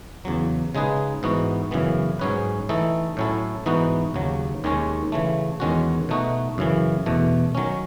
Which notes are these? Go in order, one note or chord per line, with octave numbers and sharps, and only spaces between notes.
E2 C#3 F#3
C#3 G#3 D#4 G#4 B4
G#2 E3 B3 D#4 F#4
F#2 C#3 E3 B3
G#2 F#3 C#4 G#4 B4
E3 A3 D#4 A4
A2 F#3 C#4 E4 A4
G#2 E3 B3 D#4 F#4
D#2 C#3 F#3
D#2 D#3 G#3 C#4
C#3 E3 A3
E2 D#3 G#3 C#4 F#4
B2 A3 D#4 F#4
F#2 C#3 E3
E2 B2 A3
D#3 F#3 C#4